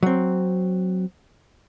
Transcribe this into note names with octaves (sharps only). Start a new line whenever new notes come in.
F#3 C4